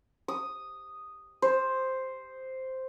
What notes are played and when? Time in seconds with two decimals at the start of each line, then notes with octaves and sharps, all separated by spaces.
0.28 D#6
1.42 C5